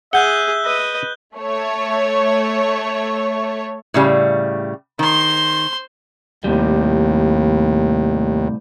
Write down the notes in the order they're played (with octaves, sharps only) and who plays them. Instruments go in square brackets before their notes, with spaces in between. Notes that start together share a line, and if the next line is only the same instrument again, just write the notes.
[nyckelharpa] G#4 [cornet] E5 [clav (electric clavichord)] F#5 [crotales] F#6 G6 G7
[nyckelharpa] B4 D#5
[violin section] A3 C#5
[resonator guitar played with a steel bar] A2 C#3 G3
[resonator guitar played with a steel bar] D#3 [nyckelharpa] C5 C6
[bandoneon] D#2 [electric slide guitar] A2 C3 G3